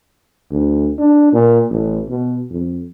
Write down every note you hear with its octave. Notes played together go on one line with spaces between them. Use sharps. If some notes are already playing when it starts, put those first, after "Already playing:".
D2
D4
A#2
A1
B2
F2